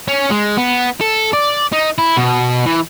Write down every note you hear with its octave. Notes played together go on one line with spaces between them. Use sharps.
C#4
G#3
B3
A4
D5
D#4
E4
B2
E3